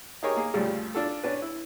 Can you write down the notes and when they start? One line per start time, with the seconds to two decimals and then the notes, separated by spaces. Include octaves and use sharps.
0.23 D#4 G4 G#4 A#4 C#5
0.37 A#3 G#4
0.54 D2 G2 C#3 F3 G3 A3
0.95 D4 F4 A4
1.24 C#4 D4 B4
1.42 E4